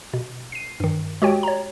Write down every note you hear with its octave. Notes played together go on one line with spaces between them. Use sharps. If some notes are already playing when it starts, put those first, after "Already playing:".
B2
C7 D#7
G2 D#3
G#3 F#4 G4 C#5 G5
C#5 A#5